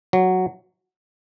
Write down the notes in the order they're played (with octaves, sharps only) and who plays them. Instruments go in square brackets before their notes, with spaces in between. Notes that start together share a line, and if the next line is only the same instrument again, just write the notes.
[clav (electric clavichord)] F#3